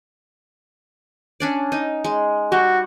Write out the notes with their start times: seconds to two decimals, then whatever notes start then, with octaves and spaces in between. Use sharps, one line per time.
1.40 C#4 D4 D5
1.72 D#4
2.04 G#3
2.52 G3 F#4